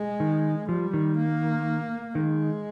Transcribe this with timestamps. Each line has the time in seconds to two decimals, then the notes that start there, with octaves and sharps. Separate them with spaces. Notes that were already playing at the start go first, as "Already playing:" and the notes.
Already playing: G#3
0.20 D#3
0.69 F3 G3
0.94 D#3
1.18 A#3
2.15 D#3 G#3